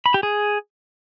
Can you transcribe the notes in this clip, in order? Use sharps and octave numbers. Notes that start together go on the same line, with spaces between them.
B5
G4
G#4